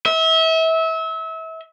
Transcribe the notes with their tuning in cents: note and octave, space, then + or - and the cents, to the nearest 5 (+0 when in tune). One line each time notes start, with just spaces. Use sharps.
E5 -30